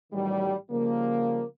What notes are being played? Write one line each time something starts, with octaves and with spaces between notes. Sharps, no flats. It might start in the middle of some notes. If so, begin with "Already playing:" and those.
A1 D#3 F#3 G3
C#3 F3 G3 A#3